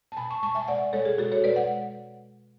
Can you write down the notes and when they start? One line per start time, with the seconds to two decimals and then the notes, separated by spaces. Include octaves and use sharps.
0.12 A5
0.17 B2 G#5 B5
0.30 A5 C#6
0.43 G#3 A5 C#6
0.55 E5 G#5
0.68 B2 D5 F#5
0.93 G#3 A4 C#5
1.05 G#4
1.18 B2 F#4 A4
1.32 A4 C#5
1.44 G#3 B4 D5
1.56 F#5